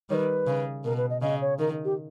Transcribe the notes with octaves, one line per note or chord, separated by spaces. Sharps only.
D#3 G3 B4 C#5
C#3
B2 A#4
B4
D#5
C#3 D#5
C#5
D#3 A#4
G4